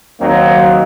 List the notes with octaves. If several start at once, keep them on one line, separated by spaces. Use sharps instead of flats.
D#2 F#3 A#3 C4 D#4